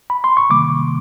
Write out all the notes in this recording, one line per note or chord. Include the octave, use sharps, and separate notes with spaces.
B5
C6
C#6
C3 D#3 G3 A#3 D6